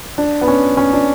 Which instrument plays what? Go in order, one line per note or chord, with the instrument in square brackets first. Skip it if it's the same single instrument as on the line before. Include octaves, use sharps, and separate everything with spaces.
[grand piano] D4
B3
C#4
C#4
D4